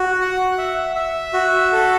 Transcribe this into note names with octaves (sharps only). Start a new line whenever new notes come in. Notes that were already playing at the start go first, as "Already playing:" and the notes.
Already playing: F#4
F#5
E5
E5
F#4
A4